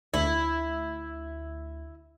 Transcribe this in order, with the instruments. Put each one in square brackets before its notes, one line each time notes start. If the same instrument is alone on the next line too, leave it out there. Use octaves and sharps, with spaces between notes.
[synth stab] D2 [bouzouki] E4